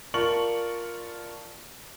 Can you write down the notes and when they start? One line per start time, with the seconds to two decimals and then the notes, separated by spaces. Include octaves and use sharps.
0.14 F4 A#4 D5 A5 C#6 F#7